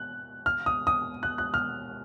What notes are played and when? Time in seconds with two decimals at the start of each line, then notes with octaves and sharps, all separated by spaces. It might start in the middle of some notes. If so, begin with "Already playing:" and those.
Already playing: F#6
0.46 F6
0.66 D#6
0.87 D#6
1.23 F#6
1.38 F#6
1.54 F6